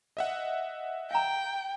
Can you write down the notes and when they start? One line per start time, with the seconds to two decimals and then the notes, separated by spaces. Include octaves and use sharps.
0.17 D#5 E5 F#5
1.11 F5 G5 A#5